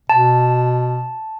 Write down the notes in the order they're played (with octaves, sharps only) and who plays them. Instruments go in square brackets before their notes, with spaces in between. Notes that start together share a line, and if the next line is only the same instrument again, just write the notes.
[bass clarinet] B2 [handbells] A5